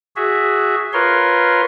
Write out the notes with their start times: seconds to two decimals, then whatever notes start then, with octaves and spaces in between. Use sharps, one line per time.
0.16 F#4 G#4 E5
0.93 F4 A#4 B4 C#5 C6